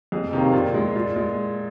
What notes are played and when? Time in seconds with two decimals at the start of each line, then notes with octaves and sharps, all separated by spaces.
0.12 F2 G#4
0.33 C3 D#3 A#3
0.53 A#2
0.74 G#3
0.96 A#2
1.16 G#3